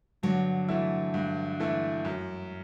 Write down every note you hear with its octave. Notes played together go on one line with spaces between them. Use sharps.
G2 D3 F#3
E3 A3 E4
G2
E3 A3 E4
F#2